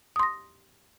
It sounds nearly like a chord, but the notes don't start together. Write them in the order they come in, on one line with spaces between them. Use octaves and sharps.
D#6 C6 A#6